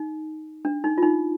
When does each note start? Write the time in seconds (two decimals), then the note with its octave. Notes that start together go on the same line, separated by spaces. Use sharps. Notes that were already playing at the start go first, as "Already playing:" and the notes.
Already playing: D#4
0.65 D4
0.84 D#4
0.98 F4
1.03 D#4